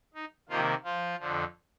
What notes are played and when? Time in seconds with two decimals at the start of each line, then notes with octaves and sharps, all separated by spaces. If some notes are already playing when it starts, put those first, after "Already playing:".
0.14 D#4
0.49 C3 D#3 F3 A#3 F4
0.84 F3 F4
1.19 F2 D3 F3